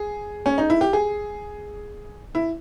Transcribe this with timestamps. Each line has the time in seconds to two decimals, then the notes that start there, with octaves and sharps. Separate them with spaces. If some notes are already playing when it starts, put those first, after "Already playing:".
Already playing: G#4
0.46 C#4
0.58 D#4
0.70 E4
0.81 G4
0.93 G#4
2.35 E4